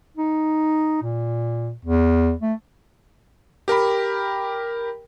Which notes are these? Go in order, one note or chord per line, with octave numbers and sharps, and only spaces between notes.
D#4
A#2
E2
A3
G4 A#4 G5 B5